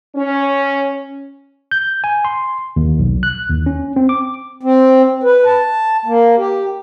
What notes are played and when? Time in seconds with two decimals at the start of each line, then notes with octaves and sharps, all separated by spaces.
0.16 C#4
1.71 G6
2.04 G#5
2.25 C6
2.76 D#2
3.00 B1
3.23 F#6
3.50 D#2
3.66 C#4
3.96 C4
4.09 D6
4.63 C4
5.23 B4
5.46 A5
6.05 A#3
6.37 G4